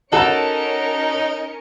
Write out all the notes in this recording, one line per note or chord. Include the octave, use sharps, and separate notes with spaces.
C#4 D#4 F#4 A4 A#4 F#5 A5 C#7